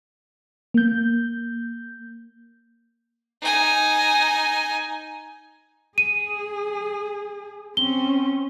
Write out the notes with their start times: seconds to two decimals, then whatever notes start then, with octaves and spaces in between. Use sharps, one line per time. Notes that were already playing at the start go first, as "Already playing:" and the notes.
0.74 A#3 G6
3.42 D#4 G#5
5.98 G#4 D#7
7.77 C4 C#4 G7